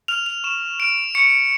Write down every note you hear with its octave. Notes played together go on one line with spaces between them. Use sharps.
F6 F7
F7
C#6 E7
F6 D7
C#6 C#7